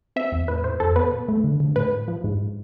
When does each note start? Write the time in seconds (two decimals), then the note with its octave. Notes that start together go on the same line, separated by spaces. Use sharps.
0.16 C4 E5
0.32 E2
0.48 A2 B4
0.64 A2 C5
0.80 F2 A4
0.96 B3 B4
1.12 B2
1.29 A3
1.44 D3
1.60 D3
1.76 A2 B4
1.93 A2
2.08 F3
2.24 G#2